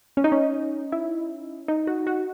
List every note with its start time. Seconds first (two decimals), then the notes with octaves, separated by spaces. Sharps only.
0.17 C#4
0.24 D#4
0.32 C#4
0.92 E4
1.68 D#4
1.87 F#4
2.07 F#4